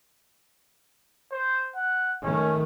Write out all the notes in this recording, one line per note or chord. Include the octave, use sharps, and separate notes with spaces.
C5
F#5
D#3 A3 C#4